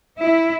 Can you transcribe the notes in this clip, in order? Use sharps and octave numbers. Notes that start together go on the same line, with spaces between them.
E4